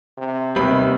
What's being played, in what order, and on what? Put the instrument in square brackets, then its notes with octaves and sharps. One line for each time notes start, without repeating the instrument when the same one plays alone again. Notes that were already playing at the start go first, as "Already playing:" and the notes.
[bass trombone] C3
[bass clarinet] D#2 [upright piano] C3 B5 [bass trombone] D#3 [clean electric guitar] G3 B3 C4